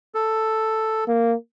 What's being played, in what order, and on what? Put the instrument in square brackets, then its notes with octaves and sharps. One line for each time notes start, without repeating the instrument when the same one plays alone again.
[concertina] A4
[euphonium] A#3